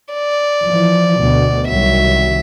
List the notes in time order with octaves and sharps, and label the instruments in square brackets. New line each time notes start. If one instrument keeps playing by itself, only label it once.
[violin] D5
[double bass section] E3 F3
D2 B2
[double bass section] C2 D#3 F#3 [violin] E5